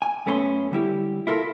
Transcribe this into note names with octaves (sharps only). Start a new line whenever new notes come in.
G#5
F#2 A3 B3 C#4 B5 C6
D3 G3 E4 G4
E4 F4 A4 A#4